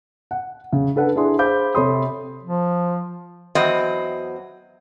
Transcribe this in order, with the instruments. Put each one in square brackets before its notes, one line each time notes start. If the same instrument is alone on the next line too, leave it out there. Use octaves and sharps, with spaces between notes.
[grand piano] F#5
C#3
D4 A4 B4 F#5
D4 E4 G#4 C6
G#4 C5 F5 B5 D6 G6
C3 A4 C#5 B5 C6 D#6
[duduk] F3
[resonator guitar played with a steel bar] E2 F#3 C4 D#5